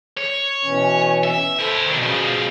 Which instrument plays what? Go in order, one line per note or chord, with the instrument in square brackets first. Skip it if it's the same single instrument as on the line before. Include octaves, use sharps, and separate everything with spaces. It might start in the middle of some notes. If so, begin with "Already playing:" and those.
[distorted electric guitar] C#5
[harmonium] B2 E3 C#4
[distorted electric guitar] E5
[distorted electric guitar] E4 C5 [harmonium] A4
[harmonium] B2 [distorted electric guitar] D#3 D4
[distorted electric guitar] C#3 F3